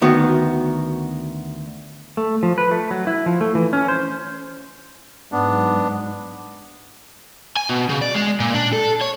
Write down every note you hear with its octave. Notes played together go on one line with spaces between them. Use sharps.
D2 D#3 B3 F#4
A3
F3
B4
A3
F#3
E4
F3
A3
E3
C#4
C5
G#2 F#3 B3 D4
G#5
B2
C#3
D5
G#3
A#2
D4
A4
C#5